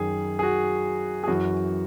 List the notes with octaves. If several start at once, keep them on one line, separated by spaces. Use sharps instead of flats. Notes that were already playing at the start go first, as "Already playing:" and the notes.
Already playing: F#2 D#3 G#4
G#4
F#4
G#4
F#2 E3 F#4